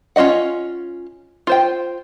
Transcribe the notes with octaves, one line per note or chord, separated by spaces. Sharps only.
C#4 F4 F#4 D#5 F#5
F4 C5 G5